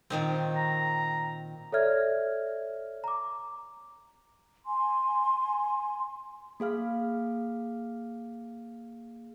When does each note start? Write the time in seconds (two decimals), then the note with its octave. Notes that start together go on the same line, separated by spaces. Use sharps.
0.10 A#2 D#3 C4
0.57 A#5
1.72 A4 C#5 D5 E5 F6 G#6
3.04 A#5 D6
4.67 G#5 C6
6.60 A#3 G#4 F5 F6